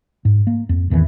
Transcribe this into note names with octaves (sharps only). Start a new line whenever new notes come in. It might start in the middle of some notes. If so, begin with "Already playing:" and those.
G#2
A#3
F2
A1 E2 D#3 E3